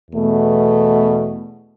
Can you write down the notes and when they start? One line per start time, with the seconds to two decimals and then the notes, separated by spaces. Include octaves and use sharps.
0.11 E2 B2 A3